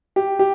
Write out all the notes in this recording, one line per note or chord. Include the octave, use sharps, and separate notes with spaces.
G4
G4